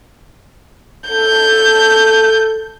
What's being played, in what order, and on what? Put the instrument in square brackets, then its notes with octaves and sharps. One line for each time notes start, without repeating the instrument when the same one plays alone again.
[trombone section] A4 [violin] G6